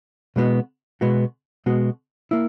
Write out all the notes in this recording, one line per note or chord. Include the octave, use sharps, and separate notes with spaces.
B2 G#3 B3 F#4
B2 G#3 B3 F#4
B2 G#3 B3 F#4
A#3 E4